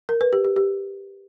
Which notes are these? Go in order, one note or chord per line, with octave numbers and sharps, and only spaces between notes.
A#4
B4
G4
G4
G4